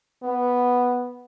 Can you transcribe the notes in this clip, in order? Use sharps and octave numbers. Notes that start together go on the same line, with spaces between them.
B3